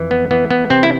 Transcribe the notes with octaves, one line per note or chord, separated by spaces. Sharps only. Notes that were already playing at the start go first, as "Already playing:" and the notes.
Already playing: F2 E3
B3
E3 B3
B3
C3 C4
E4